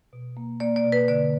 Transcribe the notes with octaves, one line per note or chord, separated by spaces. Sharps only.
B2
A#3
A#3 D5
D5
B2
B4
D3 D5